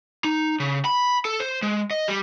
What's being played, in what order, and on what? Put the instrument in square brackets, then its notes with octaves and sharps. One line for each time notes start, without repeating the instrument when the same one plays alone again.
[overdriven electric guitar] D#4
C#3
B5
A4
C5
G#3
D#5
G3